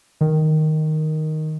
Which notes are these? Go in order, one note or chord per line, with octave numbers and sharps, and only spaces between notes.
D#3